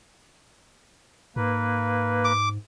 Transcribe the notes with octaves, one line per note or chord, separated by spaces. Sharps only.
G#2 A#3 B4
D6